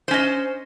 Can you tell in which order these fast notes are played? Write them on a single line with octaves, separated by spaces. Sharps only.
C5 C#4 D#5